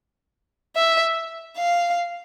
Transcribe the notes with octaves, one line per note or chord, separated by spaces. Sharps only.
E5
F5